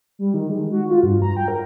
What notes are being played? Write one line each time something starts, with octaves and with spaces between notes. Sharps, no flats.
G3
D#3
G#3
F#4
F4
G2
A#5
G5
A#4